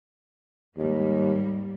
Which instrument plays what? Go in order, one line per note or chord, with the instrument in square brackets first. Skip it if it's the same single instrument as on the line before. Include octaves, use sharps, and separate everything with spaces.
[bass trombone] D#2 [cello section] G#2 G3 A#3